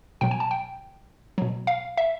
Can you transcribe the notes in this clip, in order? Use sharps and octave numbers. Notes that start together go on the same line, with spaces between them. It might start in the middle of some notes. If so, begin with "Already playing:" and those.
B2 F#3 G5
G#5
A5
G5
B2 F#3
F5
E5